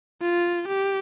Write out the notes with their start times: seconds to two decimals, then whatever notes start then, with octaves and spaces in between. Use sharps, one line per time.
0.21 F4
0.68 G4